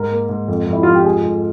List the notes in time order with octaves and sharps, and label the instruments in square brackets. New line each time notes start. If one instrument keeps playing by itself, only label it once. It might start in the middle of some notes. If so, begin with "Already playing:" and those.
Already playing: [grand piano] G#2 [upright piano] A#4
[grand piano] A#3
G#2
F2
F2
[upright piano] E4
[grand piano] F3 [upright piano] F4
[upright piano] G4
[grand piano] G#2 [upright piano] G#4
[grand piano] G#2